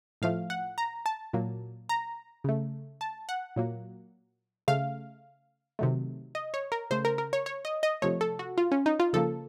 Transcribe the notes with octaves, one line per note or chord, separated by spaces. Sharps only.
A2 F3 A3 F5
F#5
A#5
A5
A#2 F#3 A#3
A#5
C#3 A3
A5
F#5
A#2 F#3 A#3
C#3 A3 F5
C3 D#3 F#3 A3
D#5
C#5
A#4
C#3 A3 C5
A#4
A#4
C#5
C#5
D#5
D#5
C3 F3 A3 C#5
A4
F#4
F4
C#4
D#4
F4
C#3 F3 A#3 A4